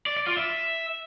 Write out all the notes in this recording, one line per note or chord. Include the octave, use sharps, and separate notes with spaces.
D5
D5
F4
E5